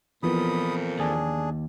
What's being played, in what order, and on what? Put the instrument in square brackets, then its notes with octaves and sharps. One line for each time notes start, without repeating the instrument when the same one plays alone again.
[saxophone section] F2 A#2 [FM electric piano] E3 F3 B3 [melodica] B5 D#6
[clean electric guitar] D#2 [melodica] D4 G#4